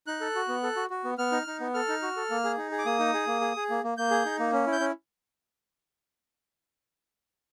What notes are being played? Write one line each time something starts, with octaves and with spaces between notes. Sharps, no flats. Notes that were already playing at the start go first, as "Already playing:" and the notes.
D#4 F#6
A4
F#4
B3
A4
F#4
F#4
B3
B3 F6
D#4
D#4
B3
A4 F6
D#4
F#4
A4
A#3
G#4
D#4
G#4
D6
A#3 D#6
D#4
G#4
A#3
G#4
G#4
A#3
A#3
A#3 G6
G#4
D#4
A#3
C#4
E4
G6
C#4